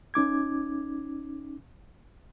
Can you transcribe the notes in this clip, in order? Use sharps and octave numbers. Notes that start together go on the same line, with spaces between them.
C#4 D#4 D6 G#6